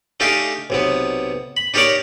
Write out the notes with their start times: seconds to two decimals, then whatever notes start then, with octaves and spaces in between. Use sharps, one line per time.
0.20 A3 D4 D#4 G4 F5 G#5
0.70 B1 C3 B3
1.57 B5
1.74 D4 D#4 G4 A#4 C#5 D5